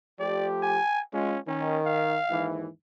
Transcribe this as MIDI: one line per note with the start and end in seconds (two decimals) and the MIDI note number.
0.19 0.78 53
0.19 0.78 57
0.19 0.78 67
0.19 0.47 74
0.63 1.02 80
1.14 1.37 56
1.14 1.39 61
1.14 1.37 65
1.48 2.17 51
1.48 1.79 61
1.86 2.48 77
2.29 2.67 39
2.29 2.67 44
2.29 2.67 52